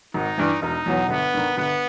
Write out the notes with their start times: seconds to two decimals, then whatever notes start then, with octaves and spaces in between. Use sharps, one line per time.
0.14 G#1 D#4
0.38 G2 E3
0.62 E1 D#4
0.86 E2 B2 F#3 B3
1.09 G1 B3
1.34 G2 D#3
1.57 G1 B3